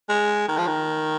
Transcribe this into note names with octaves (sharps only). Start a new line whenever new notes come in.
G#3
D#3
F3
D#3